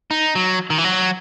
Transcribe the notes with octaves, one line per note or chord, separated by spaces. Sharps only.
D#4
F#3
D#3
E3
F#3